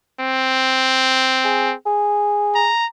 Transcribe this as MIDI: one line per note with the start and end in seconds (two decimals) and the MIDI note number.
0.20 1.74 60
1.45 1.72 68
1.86 2.69 68
2.55 2.86 82